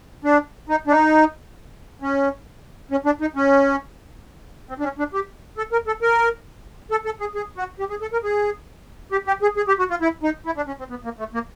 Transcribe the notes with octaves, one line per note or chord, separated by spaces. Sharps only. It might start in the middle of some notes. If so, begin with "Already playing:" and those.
D4
D#4
D4
D#4
C#4
C#4
D4
D#4
C#4
C4
D4
C#4
D4
G4
A4
A#4
A4
A#4
A4
A4
G#4
G#4
F#4
G4
G#4
A4
A#4
G#4
G4
G4
G#4
G#4
G4
F#4
F4
E4
D#4
E4
D4
C#4
C4
B3
A#3
A3
A#3